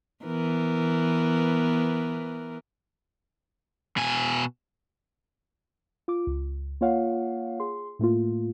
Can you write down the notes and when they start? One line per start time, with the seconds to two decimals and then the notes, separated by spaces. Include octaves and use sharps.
0.25 E3 B3 A#4
3.97 B2 G#5
6.08 F4 D6
6.27 C#2
6.81 A#3 F4 C#5 F5 F#5
7.60 G#4 C6
7.99 A2 A3 A#3 F4